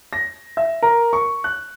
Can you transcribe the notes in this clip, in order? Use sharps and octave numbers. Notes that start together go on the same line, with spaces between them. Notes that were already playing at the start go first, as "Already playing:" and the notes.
A#6
E5
A#4
C#6
F#6